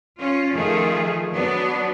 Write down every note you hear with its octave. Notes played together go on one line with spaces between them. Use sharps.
C#4 F4
D#3 F3 A3 F4 G#4
F#3 B3 D4